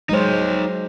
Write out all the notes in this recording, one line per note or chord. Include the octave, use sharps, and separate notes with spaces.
F#3 G#3 D#4 C5 C#5